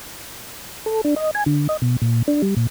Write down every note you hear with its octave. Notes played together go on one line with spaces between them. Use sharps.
A4
D4
D#5
G#5
D3
D#5
B2
A#2
D4
G3
A#2